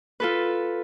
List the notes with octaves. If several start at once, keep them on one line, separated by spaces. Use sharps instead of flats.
F4 A4 B4